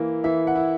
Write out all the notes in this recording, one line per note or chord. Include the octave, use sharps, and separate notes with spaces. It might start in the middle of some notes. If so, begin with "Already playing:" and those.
Already playing: E3 A#3 E4
E3 E5
F#5
E4